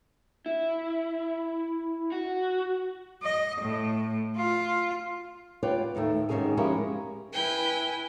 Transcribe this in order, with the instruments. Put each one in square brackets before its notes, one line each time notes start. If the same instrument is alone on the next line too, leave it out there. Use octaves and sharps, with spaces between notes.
[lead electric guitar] E4
F#4
[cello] D#5
A2
F4
[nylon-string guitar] F4 B4 C#5 D5 F#5 G5
D#2 A2 D#3 A3
G#2 D#3 F#3 C#4 G#4 G#5
F3 G#3 C#4 E4 G4 A#4
[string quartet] E4 B4 G5 G#5